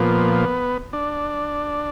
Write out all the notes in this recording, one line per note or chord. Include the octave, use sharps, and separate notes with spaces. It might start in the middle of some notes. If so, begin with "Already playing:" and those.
Already playing: A#2 F3 B3
D4